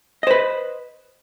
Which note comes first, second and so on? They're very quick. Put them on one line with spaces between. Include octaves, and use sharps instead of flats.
D#5 C5 B4